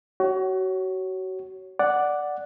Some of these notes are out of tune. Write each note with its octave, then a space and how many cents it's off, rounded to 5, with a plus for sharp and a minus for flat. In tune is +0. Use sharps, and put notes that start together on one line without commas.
F#4 +30 C#5 +0
D5 +0 F#5 +0